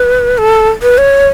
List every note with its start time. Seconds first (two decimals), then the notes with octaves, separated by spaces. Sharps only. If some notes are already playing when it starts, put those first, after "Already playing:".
Already playing: B4
0.38 A4
0.83 B4
0.98 C#5